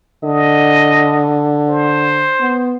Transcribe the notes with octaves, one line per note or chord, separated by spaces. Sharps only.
D3 D#5
C5
B3